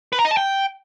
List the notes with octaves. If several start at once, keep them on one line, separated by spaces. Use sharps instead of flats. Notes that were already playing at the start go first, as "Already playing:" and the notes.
B4
A#5
D#5
A5
G5